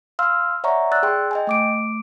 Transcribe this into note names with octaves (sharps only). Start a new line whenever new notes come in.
F5 C6 E6 F6
C#5 D5 E5 F#5 A#5 C#6
D5 E6 F#6 A6
G#4 G5 C6
D#5 G5 G#5
A3 D6 D7